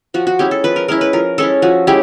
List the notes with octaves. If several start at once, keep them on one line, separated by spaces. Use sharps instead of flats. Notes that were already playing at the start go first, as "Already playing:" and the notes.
F3 F#4
F#4
G#3 C#4 E4 G4
A4
F3 B4
A#4
G#3 C#4 E4 A#4
B4
F3 A#4
G#3 C#4 E4 A4
F3 F#4
G#3 C#4 E4 G4